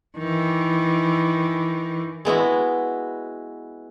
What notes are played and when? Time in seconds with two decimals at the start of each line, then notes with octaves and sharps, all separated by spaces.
0.18 D#3 E3
2.25 G#3 B3 E4 F#4